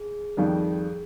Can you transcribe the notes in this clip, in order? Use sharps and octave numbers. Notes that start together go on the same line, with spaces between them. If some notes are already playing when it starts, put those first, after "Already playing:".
Already playing: G#4
F2 D#3 G3